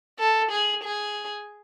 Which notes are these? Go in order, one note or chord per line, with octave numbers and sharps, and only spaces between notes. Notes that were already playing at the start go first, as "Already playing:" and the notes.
A4
G#4
G#4